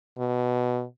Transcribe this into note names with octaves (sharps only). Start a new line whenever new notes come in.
B2